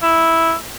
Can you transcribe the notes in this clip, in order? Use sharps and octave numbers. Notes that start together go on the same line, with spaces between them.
E4